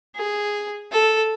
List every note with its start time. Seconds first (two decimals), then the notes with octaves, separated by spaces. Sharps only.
0.16 G#4
0.92 A4